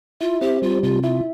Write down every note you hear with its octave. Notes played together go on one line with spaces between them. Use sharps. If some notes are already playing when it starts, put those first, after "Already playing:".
E4 F4
C4 G4
G3 F4
C3 F4
E4 F4